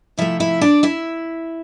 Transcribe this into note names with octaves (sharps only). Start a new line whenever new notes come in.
C3 F3 A3 E4 E5
E4 E5
D4 D5
E4 E5